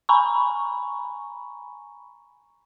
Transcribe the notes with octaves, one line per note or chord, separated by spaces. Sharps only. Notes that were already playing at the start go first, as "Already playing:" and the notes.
G#5 A#5 B5 C#6